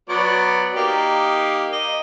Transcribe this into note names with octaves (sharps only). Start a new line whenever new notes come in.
F#3 B3 D5
A#3 D#4 G4
D#5